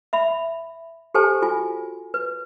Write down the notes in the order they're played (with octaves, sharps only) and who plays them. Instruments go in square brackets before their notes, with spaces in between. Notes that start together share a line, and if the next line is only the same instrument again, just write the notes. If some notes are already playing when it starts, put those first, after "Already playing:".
[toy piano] E5 B5
G4 A4 C5 G#5 A5
F4 F#4 G#5
B4